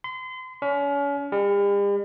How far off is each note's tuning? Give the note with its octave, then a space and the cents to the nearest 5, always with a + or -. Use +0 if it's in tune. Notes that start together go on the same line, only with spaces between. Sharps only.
C6 -35
C#4 +35
G3 +45